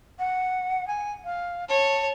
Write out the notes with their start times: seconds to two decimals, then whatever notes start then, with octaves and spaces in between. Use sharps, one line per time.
0.19 F#5
0.88 G#5
1.25 F5
1.69 C#5 A5